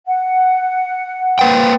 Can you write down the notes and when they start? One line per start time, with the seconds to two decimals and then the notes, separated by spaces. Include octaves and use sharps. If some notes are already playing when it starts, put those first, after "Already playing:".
0.07 F#5
1.39 A#3 B4 G5